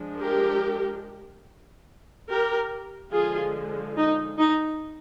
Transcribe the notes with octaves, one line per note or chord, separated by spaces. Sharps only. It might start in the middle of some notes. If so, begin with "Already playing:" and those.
Already playing: F3 G#3 D4
G4 A#4
G4 A#4
D3 F3 G#3 F4 G#4
D#4
D#4